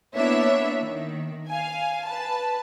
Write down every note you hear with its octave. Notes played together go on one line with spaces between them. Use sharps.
A#3 B3 D4 E4 C#5 E5
D#3
F5 G#5
B4 A5